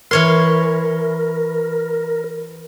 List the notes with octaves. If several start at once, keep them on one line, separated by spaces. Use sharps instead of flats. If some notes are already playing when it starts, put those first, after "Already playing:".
E3 A#4 C#5 C6